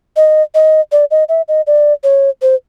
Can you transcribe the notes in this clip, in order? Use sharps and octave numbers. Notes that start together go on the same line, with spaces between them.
D#5
D#5
D5
D#5
E5
D#5
D5
C#5
C5